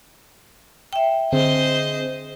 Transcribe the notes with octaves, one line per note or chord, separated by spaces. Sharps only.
E5 G5
D3 C4 G#4 C5 D#5